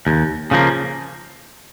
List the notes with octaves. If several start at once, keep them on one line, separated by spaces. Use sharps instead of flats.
D#2
C#3 F3 A#3